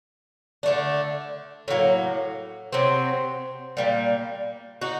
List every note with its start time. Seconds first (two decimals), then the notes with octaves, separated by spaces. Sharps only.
0.63 D3 A3 D4
1.68 A2 F#3 A#3
2.73 C3 F#3 C4
3.77 A#2 G3 A#3
4.81 D#4 F#4